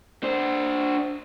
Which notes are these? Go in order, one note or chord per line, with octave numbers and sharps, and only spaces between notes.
D4 C5